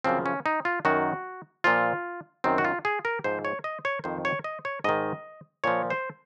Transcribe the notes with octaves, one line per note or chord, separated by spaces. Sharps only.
F#2 C#3 F3 C4
C#4
D#4
F4
F#2 D#3 F#4
A#2 F3 F4
F#2 D#3 C4
F#4
F4
G#4
A#4
G#2 F3 C5
C#5
D#5
C#5
F2 D#3 C5
C#5
D#5
C#5
G#2 D#3 D#5
A#2 F3 C#5
C5